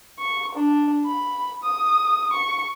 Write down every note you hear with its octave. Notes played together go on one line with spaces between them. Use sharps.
C#6
D4
B5
D#6
C#6